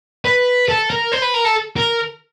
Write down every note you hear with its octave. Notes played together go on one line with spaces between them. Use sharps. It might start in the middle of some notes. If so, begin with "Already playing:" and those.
B4
A4
A#4
C5
B4
A#4
A4
A#4